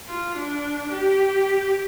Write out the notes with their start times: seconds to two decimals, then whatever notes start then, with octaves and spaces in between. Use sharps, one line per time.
0.08 F4
0.37 D4
0.92 G4